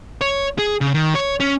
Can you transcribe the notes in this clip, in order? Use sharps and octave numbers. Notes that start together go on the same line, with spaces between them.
C#5
G#4
C#3
D#3
C#5
C#4